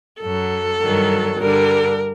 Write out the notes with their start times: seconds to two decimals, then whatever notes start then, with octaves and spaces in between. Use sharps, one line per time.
0.22 F#2 F#3 A4
0.81 G2 D#3 F#3
1.39 G2 D3 G3 A#4